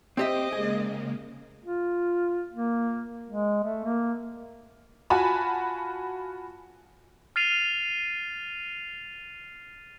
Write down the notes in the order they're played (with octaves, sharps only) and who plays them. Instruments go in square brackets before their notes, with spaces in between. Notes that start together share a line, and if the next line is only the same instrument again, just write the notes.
[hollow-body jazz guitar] C4 G4 E5 [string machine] C5 D6 [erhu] D#5
[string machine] C#3 G#3 A#3 [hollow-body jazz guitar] G#4
[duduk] F4
A#3
G#3
A3
A#3
[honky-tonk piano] F4 F#4 G#5 A5 B5
[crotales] F6 A6 C7 D#7 F7